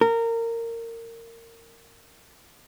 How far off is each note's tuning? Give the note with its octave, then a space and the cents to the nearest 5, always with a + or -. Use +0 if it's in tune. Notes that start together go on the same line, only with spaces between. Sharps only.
A#4 -20